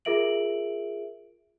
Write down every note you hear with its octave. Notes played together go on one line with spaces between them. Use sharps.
F4 G#4 A#4 E5 D7 F#7